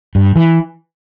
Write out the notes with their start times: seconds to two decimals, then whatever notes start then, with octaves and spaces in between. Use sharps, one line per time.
0.15 G2
0.36 E3